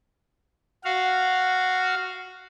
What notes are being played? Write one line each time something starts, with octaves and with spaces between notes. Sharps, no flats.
F#4 F5